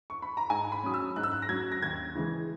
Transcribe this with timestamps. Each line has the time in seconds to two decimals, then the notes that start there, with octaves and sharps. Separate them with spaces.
0.10 C#6
0.22 B5
0.37 A#5
0.50 G#2 G#5
0.72 B5
0.84 F#3 C#4 D#6
0.94 E6
1.16 G#2 F#6
1.23 E6
1.32 F#6
1.42 A#6
1.49 F#3 C#4 G#6
1.72 A#6
1.82 D#2 G#6
2.15 C#3 E3 G#3